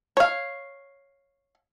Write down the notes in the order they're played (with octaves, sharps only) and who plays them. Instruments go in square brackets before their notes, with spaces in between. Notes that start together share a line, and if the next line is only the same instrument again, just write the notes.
[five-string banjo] C#5 F5